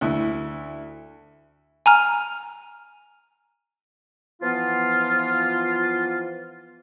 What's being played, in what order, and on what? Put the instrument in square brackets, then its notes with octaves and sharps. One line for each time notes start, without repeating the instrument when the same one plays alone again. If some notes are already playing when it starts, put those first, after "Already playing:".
[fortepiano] D2 E4
[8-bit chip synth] G#5 A#5 F6
[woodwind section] E3 F3 B3 F4